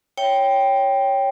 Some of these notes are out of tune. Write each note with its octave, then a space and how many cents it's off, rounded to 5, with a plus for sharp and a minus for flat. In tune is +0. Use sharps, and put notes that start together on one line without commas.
C#5 +0 E5 +5 G5 +0